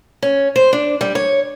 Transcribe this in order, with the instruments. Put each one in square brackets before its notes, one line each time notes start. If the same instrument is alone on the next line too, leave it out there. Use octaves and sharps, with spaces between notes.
[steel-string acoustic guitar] C#4
C5
D4
G3
C#5